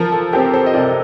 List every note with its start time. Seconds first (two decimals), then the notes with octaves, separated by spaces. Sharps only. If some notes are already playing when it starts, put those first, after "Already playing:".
Already playing: F3 A#4
0.12 A4
0.33 C4 G4 A#4
0.53 A4 C5
0.66 D#5
0.74 C3 A#4 D5